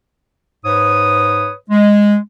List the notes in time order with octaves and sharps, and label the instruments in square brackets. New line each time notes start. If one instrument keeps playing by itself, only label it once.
[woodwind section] G#2 B4 C#5 D#6
G#3